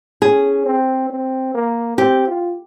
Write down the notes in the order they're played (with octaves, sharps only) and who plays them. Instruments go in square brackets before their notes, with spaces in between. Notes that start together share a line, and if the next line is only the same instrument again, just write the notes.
[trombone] C#4 [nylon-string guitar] G#4
[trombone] C4
C4
A#3
[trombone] C4 [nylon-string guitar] G4
[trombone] F4